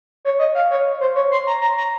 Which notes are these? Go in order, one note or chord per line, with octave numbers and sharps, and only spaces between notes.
C#5
D#5
F5
C#5
C5
C#5
C6
A#5
A#5
A#5